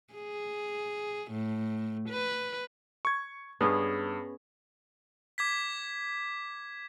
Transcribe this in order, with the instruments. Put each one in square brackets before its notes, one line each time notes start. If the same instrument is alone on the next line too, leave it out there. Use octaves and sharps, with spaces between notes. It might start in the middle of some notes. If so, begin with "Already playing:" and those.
[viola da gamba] G#4
A2
B4
[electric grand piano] C#6 G#6
[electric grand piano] G2 [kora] B3 C#4 G#4
[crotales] D6 G#6 B6